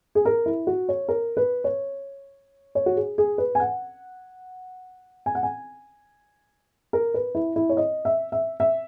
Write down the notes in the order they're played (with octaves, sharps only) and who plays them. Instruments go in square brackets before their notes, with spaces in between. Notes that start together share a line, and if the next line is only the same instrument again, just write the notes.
[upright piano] G#4
A#4
E4
F#4
C#5
A#4
B4
C#5
C#5
F#4
G#4
G#4
B4
G#5
F#5
G#5
F#5
G#5
A#4
B4
E4
E4
C#5
D#5
E5
E5
E5